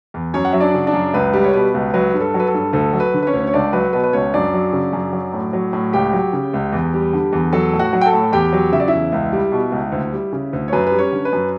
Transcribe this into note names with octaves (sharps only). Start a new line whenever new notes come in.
E2
F#2 C#4 C#5
F#5
F#3 E5
D4 D5
C#3
D4 D5
F#2
C#2 B4
G3
C#5
B2 B4
C#2
F#3 B4
G2
A4
F#3
B4
A4
G2
D2 A4
F#3
B4
D3
B4
C#4 C#5
D2
C#5
C#2 D4 D5
F#3 B4
B2 B4
B4
C#2 C#4 C#5
F#2 D4 D5
F#3
C#3
F#2
F#3
A2
F#3
A2
C#2 G4 G5
F#3
C#3
C#2
E2
G3
D3
E2
F#3 A4 A5
A2
F#4 F#5
F#3
G5
A4 A5
A2
E2 G4 G5
F#3
C#3 E5
D5
E2 E4 E5
C#2
G3
B2
C#2
D2
G3
C#3
D2
C#5
F#2 B4
B4
G3
C#4 C#5
D3
B4
F#2